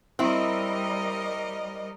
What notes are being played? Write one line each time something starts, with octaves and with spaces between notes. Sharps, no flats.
G3 C4 E4 A#4 D#5